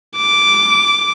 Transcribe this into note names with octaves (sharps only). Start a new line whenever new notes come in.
D6